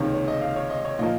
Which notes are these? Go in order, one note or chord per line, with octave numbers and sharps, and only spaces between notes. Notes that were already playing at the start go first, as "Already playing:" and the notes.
Already playing: C#2 C3 D#3 A#3 C#5
C#5
D#5
F5
C#5
D#5
C#5
A#2 F3 A#3 D#5